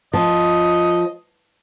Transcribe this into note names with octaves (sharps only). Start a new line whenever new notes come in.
F3 D#5